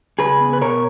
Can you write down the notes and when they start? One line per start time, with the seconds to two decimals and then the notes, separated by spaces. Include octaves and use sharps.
0.19 C#3 G#4 B4
0.40 B3
0.53 B4
0.61 B2 A#4 C#5